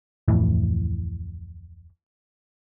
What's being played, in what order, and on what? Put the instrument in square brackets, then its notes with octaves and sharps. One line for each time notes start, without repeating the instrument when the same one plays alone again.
[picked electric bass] D1 F2 A2 E3